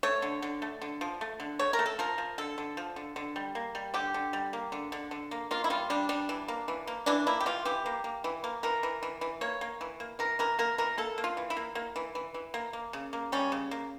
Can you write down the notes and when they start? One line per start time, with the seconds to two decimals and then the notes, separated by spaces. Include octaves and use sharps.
0.03 A3 C#5
0.22 D3
0.42 D3
0.62 A3
0.82 D3
1.01 F3
1.21 A3
1.40 D3
1.59 A3 C#5
1.73 A#4
1.79 A3
1.86 A4
1.99 F3 A#4
2.18 F3
2.38 D3 A4
2.58 D3
2.77 F3
2.96 D3
3.16 D3
3.36 G3
3.55 A#3
3.75 G3
3.94 D3 G4
4.14 D3
4.33 G3
4.53 A#3
4.72 D3
4.92 D3
5.11 D3
5.31 A#3
5.51 A#3 F4
5.64 E4
5.70 G3 F4
5.90 G3 D4
6.09 G3 D4
6.29 E3
6.48 A#3
6.68 E3
6.87 A#3
7.06 E3 D4
7.27 A#3 E4
7.40 G4
7.46 E3 F4
7.65 E3 G4
7.86 A#3
8.04 A#3
8.24 E3
8.44 A#3
8.63 E3 A#4
8.83 E3
9.03 E3
9.21 E3
9.41 A#3 C#5
9.61 A#3
9.81 E3
10.00 A#3
10.19 E3 A#4
10.39 E3 A#4
10.59 A#3 A#4
10.78 E3 A#4
10.98 A#3 A4
11.18 A#3
11.24 F4
11.37 E3
11.50 E4
11.56 A#3
11.75 A#3
11.96 E3
12.15 E3
12.34 E3
12.54 A#3
12.73 A#3
12.93 C#3
13.13 A#3
13.32 G3 C#4
13.52 C#3
13.71 A#3